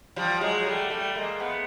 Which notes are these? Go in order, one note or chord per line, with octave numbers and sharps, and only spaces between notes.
F3 G3
F#3 G#3
G3 A3
G3 A3
G#3 A#3
A3 B3